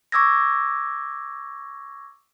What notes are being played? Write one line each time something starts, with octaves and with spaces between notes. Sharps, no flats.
C#6 D6 E6 G#6 A#6